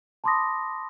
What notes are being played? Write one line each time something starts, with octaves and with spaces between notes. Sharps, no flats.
A5 B5 C6 D6 D#6 A#6